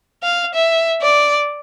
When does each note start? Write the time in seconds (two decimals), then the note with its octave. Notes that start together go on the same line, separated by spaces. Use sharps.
0.23 F5
0.55 E5
1.02 D5